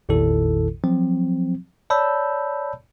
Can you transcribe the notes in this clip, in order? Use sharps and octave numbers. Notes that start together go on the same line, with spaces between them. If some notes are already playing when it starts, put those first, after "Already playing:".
A1 E2 A#2 D#3 E4 A4
F3 F#3 C4
C#5 D5 A5 B5 E6 G6